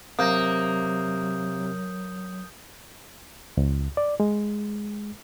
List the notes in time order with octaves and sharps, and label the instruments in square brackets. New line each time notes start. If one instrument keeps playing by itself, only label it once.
[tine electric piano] C3 [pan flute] F#3 [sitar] A#3 [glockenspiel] D#6 G6
[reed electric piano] C#2
D5
G#3